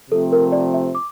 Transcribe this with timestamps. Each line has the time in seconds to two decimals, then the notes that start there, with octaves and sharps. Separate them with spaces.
0.11 C3 F3 A3 C4 A4
0.32 A#4
0.52 D5
0.74 E5
0.95 D6